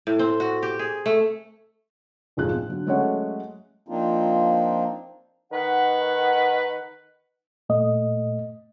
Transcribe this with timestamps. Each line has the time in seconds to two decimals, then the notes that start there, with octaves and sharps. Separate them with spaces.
0.07 A2
0.19 C4
0.40 F#4
0.63 G4
0.79 G#4
1.06 A3
2.37 F1 A#1 G#2 F3 G#4 F#6
2.53 C4
2.69 D3 F#3
2.87 F#3 G#3 A3 C#4 C#5 F#5
3.88 F3 A#3 C4 D4 D#4 F4
5.52 D#3 B4 F#5
7.69 A#2 A3 D#5